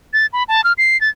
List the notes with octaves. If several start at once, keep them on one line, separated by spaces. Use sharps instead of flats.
A6
B5
A5
F6
C7
A6